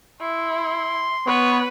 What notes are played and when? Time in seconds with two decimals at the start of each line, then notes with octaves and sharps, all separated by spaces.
0.21 E4 C6
1.27 B3 B4 C#5